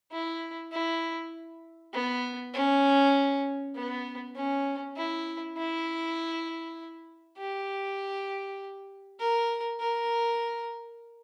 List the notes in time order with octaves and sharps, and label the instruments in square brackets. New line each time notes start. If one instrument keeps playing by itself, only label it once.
[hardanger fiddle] E4
E4
B3
C#4
B3
C#4
E4
E4
G4
A#4
A#4